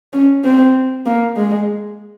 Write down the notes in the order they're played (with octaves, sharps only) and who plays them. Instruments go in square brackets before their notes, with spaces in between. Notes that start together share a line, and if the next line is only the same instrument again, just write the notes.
[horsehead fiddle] C#4
C4
A#3
G#3